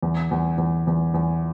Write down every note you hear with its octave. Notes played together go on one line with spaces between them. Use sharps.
E2
E2
E2
E2
E2